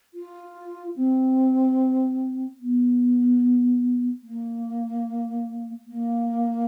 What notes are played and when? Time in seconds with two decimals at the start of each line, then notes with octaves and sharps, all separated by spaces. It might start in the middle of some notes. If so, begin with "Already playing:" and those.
0.14 F4
0.96 C4
2.60 B3
4.23 A#3
5.87 A#3